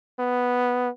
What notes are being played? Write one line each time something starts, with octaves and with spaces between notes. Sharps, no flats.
B3